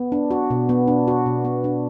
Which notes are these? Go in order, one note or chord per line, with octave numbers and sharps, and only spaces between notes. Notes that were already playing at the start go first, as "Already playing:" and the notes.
Already playing: B3
D4
F#4
B2
B3
D4
F#4
B2
B3
D4